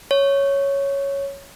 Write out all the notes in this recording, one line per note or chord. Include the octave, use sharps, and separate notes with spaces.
C#5